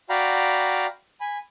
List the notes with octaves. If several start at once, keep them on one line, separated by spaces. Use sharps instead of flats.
F#4 D5 F5 G5 A#5 B5
G#5 B5